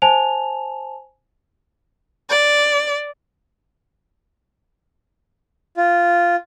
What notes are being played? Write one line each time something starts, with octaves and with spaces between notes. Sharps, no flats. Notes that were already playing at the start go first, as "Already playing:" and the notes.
C5 G#5 A5 F7
D5
F4